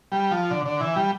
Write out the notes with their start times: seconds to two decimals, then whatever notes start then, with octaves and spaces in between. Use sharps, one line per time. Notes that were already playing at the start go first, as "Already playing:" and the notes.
0.12 G3
0.31 F3
0.51 D3
0.66 D3
0.80 E3
0.96 G3